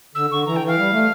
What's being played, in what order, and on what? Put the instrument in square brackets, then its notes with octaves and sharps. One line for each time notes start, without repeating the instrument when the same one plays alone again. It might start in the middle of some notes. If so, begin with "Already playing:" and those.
[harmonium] D3 [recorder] E6
[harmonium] D3 [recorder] C#6
[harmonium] E3 [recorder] A#5
[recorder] G5
[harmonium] E3
[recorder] F5
[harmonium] G3
A3